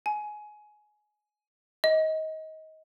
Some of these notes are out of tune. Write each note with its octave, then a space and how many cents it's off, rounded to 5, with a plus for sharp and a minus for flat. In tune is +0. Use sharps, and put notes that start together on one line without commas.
G#5 +20
D#5 +25